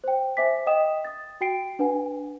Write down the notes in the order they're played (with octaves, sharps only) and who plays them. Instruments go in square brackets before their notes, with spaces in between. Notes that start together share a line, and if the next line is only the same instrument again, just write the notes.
[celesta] C5 G5
C5 E5 G#5 D6 B6
D#5 F5 G5 D#6 E7
D#6 A6
F#4 G5 C7 D7
D4 B4 F#5 G#5